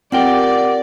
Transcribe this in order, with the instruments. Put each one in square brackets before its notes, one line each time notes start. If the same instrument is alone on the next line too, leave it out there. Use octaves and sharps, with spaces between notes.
[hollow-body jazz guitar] C4 F4 G5 [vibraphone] G4 A#4 F#5 [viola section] D5